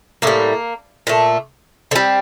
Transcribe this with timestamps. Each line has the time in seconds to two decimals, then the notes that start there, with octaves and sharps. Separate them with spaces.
0.22 A2 G3 A#3
1.07 A#2 A3
1.91 D3 G3 C4